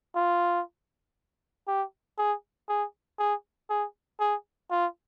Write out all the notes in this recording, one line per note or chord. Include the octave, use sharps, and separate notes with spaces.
F4
G4
G#4
G#4
G#4
G#4
G#4
F4